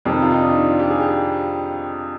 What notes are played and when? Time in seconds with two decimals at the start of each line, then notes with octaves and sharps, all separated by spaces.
0.05 F2 C3 D#3 G4
0.22 F4
0.31 D#4
0.41 D4
0.50 D#4
0.70 F4
0.79 G4
0.90 G#4
1.00 G4